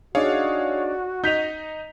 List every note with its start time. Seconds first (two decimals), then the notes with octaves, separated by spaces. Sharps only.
0.15 D4 D#4 F#4 G#4 C#5 D5 F5
1.24 D#4 D#5 G6 B6 F7